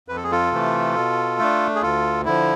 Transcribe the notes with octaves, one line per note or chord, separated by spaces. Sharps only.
F2 B4
A4
G#4
F4 A4
C3 E3 A3
B2
A3 D4
G#4
D2 F4 A4
D3 F3 E4